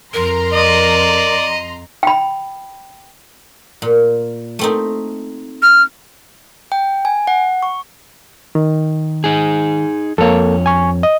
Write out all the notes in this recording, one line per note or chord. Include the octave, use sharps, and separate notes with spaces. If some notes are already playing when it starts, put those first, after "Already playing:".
F2 A#4 A#5 C6
D5 D#5
G5 B5
A#2
A3 C4 D#4
F6
G5
G#5
F#5
C#6
D#3
D#4 G#4
F2 A#3 A4 C#5
G#5 C#6
D#5